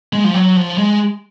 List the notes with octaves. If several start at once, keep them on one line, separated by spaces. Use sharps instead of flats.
G#3
F3
F#3
F3
G#3